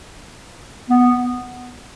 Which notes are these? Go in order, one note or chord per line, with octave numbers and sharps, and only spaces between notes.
B3